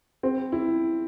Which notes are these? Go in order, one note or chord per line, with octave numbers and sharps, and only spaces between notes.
C4
E4